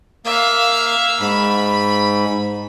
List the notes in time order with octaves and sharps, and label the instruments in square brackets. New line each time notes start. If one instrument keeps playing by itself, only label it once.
[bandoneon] A#3 [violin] E5 F5
[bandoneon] G#2 [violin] B5